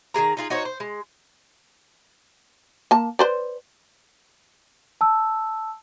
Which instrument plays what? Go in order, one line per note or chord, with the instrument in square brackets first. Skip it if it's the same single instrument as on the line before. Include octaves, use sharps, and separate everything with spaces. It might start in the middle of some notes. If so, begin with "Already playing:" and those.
[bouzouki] D#3 G3 G#4 A#5
D#4 F4 G#4
D#4 F#4 C5 C#5
C5
G#3
[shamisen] A#3 A5
B4 C5 D5
[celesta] A5 E6